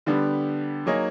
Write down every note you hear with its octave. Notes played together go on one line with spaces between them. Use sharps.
D3 G3 B3 D4 G4
F#3 A#3 D#4 G#4 C#5